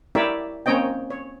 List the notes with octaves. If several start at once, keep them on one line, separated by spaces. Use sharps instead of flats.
E4 G4 A#4 C#5 D5 E5
A#3 C4 C#4 C#5 D#5 G5
C#5